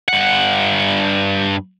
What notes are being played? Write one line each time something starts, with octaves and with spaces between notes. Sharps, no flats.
G2 F#5